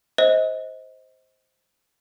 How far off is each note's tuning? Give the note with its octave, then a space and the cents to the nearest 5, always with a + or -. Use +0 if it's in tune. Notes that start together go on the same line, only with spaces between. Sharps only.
C5 +0 D#5 +25